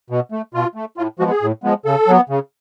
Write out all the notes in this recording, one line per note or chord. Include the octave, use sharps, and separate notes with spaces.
B2
A3
B2 F4
A3
A2 F4
F3 G#3 B3 F#4
G#4
A2
F3 G#3 B3
C#3 A4
F#3 B3
C#3